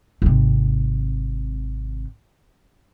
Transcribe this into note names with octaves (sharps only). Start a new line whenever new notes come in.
G#1 C3